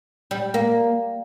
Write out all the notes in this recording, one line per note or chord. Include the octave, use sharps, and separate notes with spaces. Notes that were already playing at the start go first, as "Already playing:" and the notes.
G3
A#3